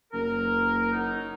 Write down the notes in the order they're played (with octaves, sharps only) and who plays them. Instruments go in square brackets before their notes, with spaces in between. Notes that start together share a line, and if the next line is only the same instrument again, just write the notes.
[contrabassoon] F#1 [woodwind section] A#4
[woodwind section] F#3 D#4